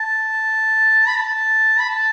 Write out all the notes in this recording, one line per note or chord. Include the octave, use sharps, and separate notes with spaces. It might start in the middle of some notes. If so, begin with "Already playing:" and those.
Already playing: A5
B5
A5
B5
A5